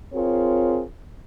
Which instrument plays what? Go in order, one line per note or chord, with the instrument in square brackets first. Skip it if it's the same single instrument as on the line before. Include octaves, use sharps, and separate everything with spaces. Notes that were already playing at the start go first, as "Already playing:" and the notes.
[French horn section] C4 F4 G#4 A#4 C#5